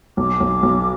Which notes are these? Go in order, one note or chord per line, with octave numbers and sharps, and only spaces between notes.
B1 D6
B1
B1